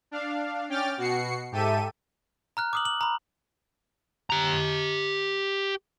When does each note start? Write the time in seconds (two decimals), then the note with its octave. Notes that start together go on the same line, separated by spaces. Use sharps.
0.11 D4 F5
0.69 C#4 G5 D6 F6 A6
0.97 B2 F#4 C7 C#7
1.52 G#2 G4 A4 E5 D#7
2.57 A#5 F6 F#6
2.73 D6 D#6 F#7
2.85 F#7
3.01 A#5 B5
4.30 G4 A#5